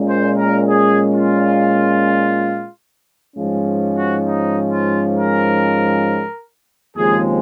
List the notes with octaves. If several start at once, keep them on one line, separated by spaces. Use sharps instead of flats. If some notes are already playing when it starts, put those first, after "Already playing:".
Already playing: A#2 G#3 C#4
C5
A#4
G#4
F4
G#2 F3 G#3 C#4
F#4
D#4
F4
A#4
D#2 C#3 F3 G#3 C4 G#4